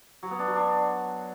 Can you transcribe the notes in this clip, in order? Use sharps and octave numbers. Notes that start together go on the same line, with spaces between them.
F#3
B3
D4
F#3
D4